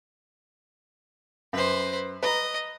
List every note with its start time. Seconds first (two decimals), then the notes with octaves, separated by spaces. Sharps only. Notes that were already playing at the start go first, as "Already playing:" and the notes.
1.53 F#2 B4 C5
2.23 B4 D#5 A#5